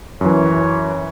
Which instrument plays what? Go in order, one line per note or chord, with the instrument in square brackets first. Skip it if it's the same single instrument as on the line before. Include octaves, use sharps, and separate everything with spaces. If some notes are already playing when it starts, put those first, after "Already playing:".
[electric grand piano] F#2 E3 [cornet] C#5